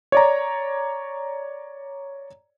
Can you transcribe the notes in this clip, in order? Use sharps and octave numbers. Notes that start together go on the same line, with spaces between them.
C#5 D5 A#5